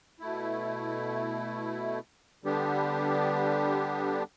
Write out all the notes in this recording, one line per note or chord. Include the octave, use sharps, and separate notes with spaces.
B2 A3 E4
D3 G3 B3 D4 G4